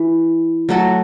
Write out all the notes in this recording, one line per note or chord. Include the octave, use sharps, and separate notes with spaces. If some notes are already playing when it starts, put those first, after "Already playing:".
Already playing: E3
F#3 A3 F#4 A4